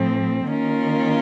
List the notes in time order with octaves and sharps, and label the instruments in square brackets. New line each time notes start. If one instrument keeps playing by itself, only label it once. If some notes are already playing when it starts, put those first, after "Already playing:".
Already playing: [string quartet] A2 F3 C4
D#3 A#3 C#4 F4 A#4